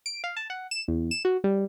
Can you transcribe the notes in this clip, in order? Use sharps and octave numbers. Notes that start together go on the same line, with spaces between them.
D7
F5
A5
F#5
E7
E2
E7
F#4
G3